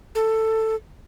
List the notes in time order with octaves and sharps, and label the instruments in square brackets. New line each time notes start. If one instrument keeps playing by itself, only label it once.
[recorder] A4